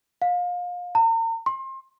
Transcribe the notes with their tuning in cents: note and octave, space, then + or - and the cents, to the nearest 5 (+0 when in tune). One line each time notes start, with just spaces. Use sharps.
F5 +30
A#5 -40
C6 +30